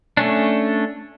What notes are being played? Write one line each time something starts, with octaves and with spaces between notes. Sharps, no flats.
A3 C#4 D4